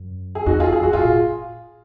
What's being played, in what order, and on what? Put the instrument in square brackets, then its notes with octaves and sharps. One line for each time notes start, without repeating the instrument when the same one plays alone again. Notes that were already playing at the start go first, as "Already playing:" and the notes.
Already playing: [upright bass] F#2
[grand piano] G#4
[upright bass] F2 [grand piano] D#4 F#4
[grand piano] F4 G#4
G#4
[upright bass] F#2 [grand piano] F#4
[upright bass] G#2 [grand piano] F4 G#4
[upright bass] A#2